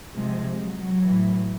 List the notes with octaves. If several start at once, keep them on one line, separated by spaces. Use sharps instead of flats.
C3 F3 G#3
F#3
A2 E3